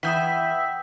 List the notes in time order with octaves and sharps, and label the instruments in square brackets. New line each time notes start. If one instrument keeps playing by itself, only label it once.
[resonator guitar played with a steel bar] E2 E3 [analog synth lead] E5 [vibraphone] F#5 G5 [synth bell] D#6 G6 B6